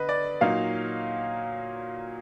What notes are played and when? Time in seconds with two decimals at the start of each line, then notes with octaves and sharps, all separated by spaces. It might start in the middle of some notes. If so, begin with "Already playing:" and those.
Already playing: D3 B4 D#5
0.09 D5
0.41 A#2 F#3 A#3 D#4 F5